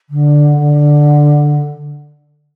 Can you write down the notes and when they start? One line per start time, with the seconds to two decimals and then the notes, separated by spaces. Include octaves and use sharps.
0.09 D3
0.57 D3